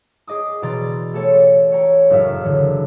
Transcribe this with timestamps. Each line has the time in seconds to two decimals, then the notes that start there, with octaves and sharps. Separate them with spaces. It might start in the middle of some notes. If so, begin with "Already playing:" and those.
0.27 G#4 D#5 D6 D#6
0.62 B2 E3 D5 A#5 C6 A6
1.14 A3 G4 A4 C#5 G5
1.72 C#5 G5 A#5
2.10 F#1 A2 C#3 A#4 E5 F5
2.44 A2 D3 E3